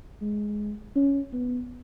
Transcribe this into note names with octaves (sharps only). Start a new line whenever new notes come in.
G#3
C#4
B3